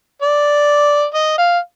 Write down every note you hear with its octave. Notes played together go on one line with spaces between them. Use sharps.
D5
D#5
F5